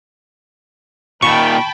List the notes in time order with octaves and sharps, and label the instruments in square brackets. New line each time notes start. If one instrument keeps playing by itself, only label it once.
[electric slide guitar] A#2 D#3 [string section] G5 A5 B5 [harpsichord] C#6